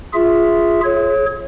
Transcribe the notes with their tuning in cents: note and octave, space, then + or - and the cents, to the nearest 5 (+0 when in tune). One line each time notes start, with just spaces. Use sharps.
F4 -10 G#4 +0 E5 +0
G#4 +40 C#5 -20